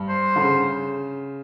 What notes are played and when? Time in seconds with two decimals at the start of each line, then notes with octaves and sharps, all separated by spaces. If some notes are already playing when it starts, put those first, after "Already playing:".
Already playing: G2
0.09 C5
0.36 D3
0.40 C#3